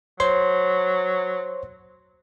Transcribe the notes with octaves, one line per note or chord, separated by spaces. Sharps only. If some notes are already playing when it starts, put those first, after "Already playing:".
F#3 C5 C#5 C6